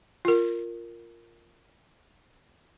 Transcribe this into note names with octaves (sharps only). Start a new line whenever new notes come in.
F4 A#4